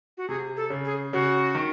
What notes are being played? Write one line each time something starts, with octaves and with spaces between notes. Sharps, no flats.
F#4
C3 G#4
A4
C#3
G#4
C#3 F#4
D#3